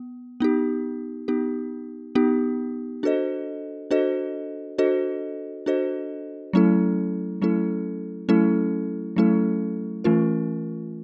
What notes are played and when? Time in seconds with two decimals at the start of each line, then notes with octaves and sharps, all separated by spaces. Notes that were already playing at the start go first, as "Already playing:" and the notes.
Already playing: B3
0.40 B3 D#4 G4
1.28 B3 D#4 G4
2.15 B3 D#4 G4
3.03 D4 F#4 A4 C5 D#5
3.91 D4 F#4 A4 C5 D#5
4.78 D4 F#4 A4 C5 D#5
5.66 D4 F#4 A4 C5 D#5
6.53 F#3 A3 C#4 E4 A4
7.42 F#3 A3 C#4 E4 A4
8.29 F#3 A3 C#4 E4 A4
9.16 F#3 A3 C#4 E4 A4
10.04 E3 A3 C#4 F4 A#4